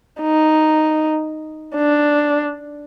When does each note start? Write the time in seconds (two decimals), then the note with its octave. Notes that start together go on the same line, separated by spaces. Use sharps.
0.21 D#4
1.76 D4